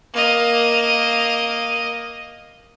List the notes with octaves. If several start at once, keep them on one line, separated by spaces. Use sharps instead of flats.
A#3 D#5